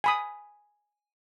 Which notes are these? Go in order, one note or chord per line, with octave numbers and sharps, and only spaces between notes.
G#5 B5 D#6